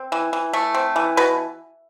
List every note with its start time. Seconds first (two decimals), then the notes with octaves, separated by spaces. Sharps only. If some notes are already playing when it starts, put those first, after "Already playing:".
Already playing: C4
0.12 E3
0.33 E3
0.53 A3
0.74 C4
0.96 E3
1.17 B2 B4